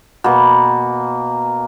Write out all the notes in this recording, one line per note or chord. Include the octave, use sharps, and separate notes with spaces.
B2 A#3